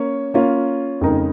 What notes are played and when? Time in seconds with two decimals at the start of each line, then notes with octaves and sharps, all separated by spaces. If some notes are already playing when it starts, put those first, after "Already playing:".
Already playing: A#3 C#4 C#5
0.34 A#3 C#4 F4
1.01 F2 C#3 G#3 D#4 A#4